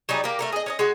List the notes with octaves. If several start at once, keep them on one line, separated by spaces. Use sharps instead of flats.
F#3 G3 D#4 G#4
A#3 G4
A3 A4 A#4
G#4 D#5
C#4 D4 D#5
G#3 F#4